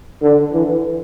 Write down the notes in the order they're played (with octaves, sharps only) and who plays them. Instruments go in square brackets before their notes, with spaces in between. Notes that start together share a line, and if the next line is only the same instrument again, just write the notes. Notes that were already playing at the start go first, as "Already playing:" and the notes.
[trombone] D3
E3